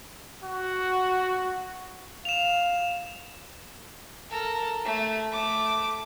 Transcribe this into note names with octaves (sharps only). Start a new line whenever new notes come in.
F#4
F5 E7 F7
A4 A#4
A3
A3 D6